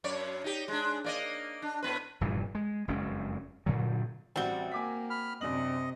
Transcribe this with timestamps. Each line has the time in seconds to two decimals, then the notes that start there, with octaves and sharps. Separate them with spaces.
0.04 F#2 C#5 D5
0.44 D#4 G4
0.68 G#3 D4
1.04 A#3 D5 D#5
1.62 D4
1.82 A2 B3 B4
2.21 F1 G2 A#2 E3
2.55 G#3
2.88 F#1 F2 G#3 C#4
3.66 G2 A#2 D3 F#3
4.36 A1 G3 C4 F#4 G7
4.72 A#3 G#5 D6 B6
5.10 B5 F6
5.41 F#2 C3 D4 D#5 F#7